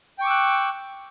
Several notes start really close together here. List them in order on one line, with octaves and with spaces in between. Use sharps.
G5 C#6 D6 E6 F#6